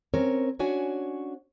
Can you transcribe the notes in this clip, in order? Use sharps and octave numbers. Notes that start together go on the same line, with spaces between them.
C4 C#4 A#4 C#5
C#4 D4 F#4 C#5 G#5